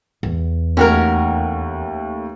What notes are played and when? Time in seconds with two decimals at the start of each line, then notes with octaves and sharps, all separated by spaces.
0.23 E2
0.77 D#2 A3 C#4 F#4 A#4